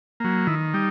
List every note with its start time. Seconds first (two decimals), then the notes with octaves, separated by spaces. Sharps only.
0.20 F#3 A#3
0.47 D#3 E4
0.74 G3 D#4